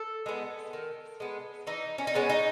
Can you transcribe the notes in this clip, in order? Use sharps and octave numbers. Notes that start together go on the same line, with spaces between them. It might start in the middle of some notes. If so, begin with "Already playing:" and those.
Already playing: A4
G#3 B3
D#3
G#3 B3
E3 D#4
C#4
D#4
G#3 B3 C#4
D#4